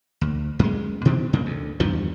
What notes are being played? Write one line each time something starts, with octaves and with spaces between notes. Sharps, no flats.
D2
F#2 G#3
B2 D#3 E3 C4
F2 C#3 A#3
D2
E2 G2 D#3 F3